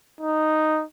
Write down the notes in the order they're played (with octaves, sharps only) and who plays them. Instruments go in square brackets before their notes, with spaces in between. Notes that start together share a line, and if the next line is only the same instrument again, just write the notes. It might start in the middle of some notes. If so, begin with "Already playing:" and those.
[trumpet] D#4